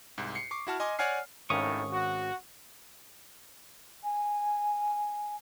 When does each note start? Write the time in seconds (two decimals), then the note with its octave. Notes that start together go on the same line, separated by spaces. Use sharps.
0.18 C2 G#2
0.35 C7 C#7
0.51 C#6 D6 C7
0.67 E4 F#4 A5 F6
0.80 D#5 G#5 C6 D6
0.99 C#5 D5 F#5 G#5 F6 C7
1.50 G#1 A2 D#3 C#4 F5 C#6 D#6
1.92 F#4
4.03 G#5